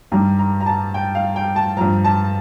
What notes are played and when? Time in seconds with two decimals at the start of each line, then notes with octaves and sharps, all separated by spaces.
0.11 G2 D#3 G3 A#5
0.39 A#5
0.61 A#5
0.66 A5
0.94 G5
1.15 F5
1.36 G5
1.56 A5
1.77 G2 F3 A#5
2.04 A5